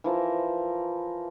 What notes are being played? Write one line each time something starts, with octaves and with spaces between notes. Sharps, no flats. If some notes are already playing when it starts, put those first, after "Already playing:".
E3 F3 A#4 A#5